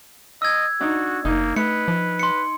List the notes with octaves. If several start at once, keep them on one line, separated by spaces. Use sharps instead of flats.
D#5 E6 G#6
D4 D#4 F#4
F#1 A#3 D#4
A3 B4 C#7
F3
C6 C#7